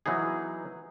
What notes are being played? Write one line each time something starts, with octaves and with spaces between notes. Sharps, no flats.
E3 F#3 B3 D#4 G#4